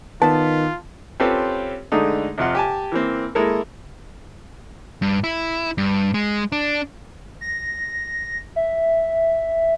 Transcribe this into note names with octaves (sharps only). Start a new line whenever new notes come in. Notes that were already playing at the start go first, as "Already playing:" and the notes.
D#3 B3 F4 A5
C4 C#4 F4 G4 A4 B4
D3 G#3 A3 D4 D#4
F2 C3 F4 F#5
G4 G#5 A5
E3 A#3 C4
G#3 A#3 E4 A4 A#4
G2
E4
G2
G#3
D4
A#6
E5